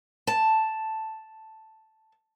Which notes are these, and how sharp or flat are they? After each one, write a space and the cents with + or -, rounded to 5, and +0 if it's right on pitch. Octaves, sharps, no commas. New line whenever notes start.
A5 +0